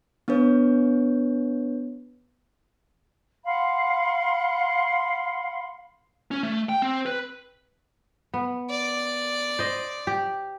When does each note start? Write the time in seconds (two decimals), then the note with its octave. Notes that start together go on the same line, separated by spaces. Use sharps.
0.28 B3 D4 B4 C#5
3.44 F5 F#5 B5 C6
6.31 C#4
6.43 A3
6.69 G5
6.82 C4
7.06 B4
8.34 B3
8.70 D5
9.59 C5 D#5
10.07 G4